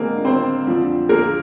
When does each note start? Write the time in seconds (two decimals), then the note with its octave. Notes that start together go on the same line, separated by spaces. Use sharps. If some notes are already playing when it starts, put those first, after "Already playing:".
Already playing: D3 G#3 A#3 C4
0.25 C4 C5
0.67 F2 D3 F3
1.09 A#3 A#4